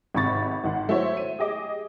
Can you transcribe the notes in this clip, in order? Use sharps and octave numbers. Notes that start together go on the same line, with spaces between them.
G#1 G#2 C3 B5 C#6 A6
G#1 D#3 F#5 C6
F#3 A3 E4 C5 C#5 E5
D#7
G4 G#4 D#5 D6